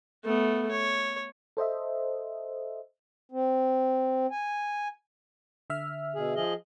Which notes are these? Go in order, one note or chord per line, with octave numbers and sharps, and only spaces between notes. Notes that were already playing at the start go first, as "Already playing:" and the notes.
A3 B3
C#5
A4 C5 D#5 E5
C4
G#5
D3 E5 F6
B2 G#4
F3 G#4 D#5